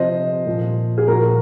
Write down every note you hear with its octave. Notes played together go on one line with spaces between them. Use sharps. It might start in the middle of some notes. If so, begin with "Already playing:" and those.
Already playing: C3 F3 C5 D#5
A#2 F3
G#4
A#2 F3 F#4 A#4